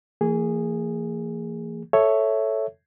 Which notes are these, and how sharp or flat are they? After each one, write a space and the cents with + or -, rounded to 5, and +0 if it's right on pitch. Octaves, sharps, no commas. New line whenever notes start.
E3 +30 A#3 -40 G#4 -10
A4 +0 C#5 +0 E5 +0